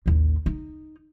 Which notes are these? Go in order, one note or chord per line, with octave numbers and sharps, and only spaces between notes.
A1 D#2
D#4